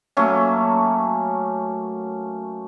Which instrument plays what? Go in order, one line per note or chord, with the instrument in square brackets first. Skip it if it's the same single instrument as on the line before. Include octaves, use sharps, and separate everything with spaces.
[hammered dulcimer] F#3 A3 A#3 C#4